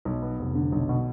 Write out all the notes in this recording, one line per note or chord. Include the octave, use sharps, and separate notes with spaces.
B1
B3
F1
D3
B1
B2